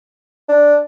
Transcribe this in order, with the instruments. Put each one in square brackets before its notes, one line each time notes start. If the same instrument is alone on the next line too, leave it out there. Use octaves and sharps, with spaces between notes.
[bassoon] D4